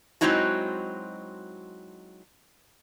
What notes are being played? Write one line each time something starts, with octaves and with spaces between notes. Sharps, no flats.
F#3 G#3 C4 D#4 E4 F#4